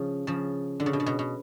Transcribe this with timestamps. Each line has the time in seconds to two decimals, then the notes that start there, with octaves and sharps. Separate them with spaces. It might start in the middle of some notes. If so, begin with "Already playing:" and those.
Already playing: C#3 F3
0.27 C#3 F3
0.80 D3
0.86 C#3
0.93 B2
1.00 C#3
1.06 B2
1.19 B2